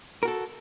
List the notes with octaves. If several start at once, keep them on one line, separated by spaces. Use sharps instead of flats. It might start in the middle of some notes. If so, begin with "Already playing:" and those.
F#4 A4 A#4